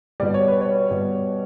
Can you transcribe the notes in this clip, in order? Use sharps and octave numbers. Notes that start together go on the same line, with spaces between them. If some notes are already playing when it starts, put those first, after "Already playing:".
B2 G3 D5
C#5
B4
C#5
B2 G3